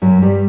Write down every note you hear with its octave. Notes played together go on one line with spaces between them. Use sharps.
F#2 F#3
G2 G3